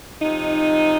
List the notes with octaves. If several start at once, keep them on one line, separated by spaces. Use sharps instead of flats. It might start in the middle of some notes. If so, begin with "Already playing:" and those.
C3 F3 D#4